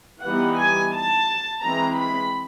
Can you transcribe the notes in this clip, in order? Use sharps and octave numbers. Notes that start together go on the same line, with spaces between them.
E3 G3 B3 D#4 F#5
G#5
A5
E3 G#3 C4 A#5
B5